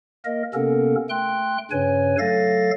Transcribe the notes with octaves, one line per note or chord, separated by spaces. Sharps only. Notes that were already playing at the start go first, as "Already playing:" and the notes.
A#3 A#4 D#5
C3 A#3 B3 C#4 A4 A#4
A3 G5 C6 F#6
G2 C#3 C#4 B4 C#5 G#5
F#3 A3 A4 F5 A6 A#6